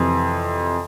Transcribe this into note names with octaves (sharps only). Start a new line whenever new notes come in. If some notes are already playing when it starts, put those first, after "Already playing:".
Already playing: F2 C3 E3